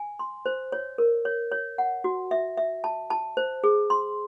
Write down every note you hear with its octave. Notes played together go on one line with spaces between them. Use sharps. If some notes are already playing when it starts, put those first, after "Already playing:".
Already playing: G#5
C6
C5
C#5
A#4
C#5
C#5
F#5
F#4
E5
E5
A5
A5
C5
G#4
C6